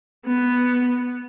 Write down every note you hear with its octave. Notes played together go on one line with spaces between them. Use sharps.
B3